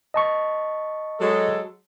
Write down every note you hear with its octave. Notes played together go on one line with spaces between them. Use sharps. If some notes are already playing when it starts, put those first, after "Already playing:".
D#5 A5 C#6
F#3 G#3 A4